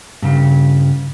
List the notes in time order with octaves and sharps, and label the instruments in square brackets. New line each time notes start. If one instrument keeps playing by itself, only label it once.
[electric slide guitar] G2 C#3